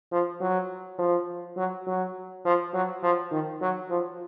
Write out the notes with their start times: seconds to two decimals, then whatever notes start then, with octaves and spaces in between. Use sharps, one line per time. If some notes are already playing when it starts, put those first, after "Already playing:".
0.12 F3
0.41 F#3
0.98 F3
1.57 F#3
1.87 F#3
2.45 F3
2.74 F#3
3.03 F3
3.31 D#3
3.61 F#3
3.90 F3